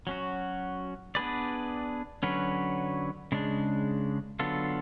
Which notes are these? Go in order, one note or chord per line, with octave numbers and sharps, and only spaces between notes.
F#3 C#4 F#4
B3 D4 G#4 B4 D5
D3 F#3 C#4 F#4 B4
C#3 G#3 D4
D3 F#3 B3 F4 A4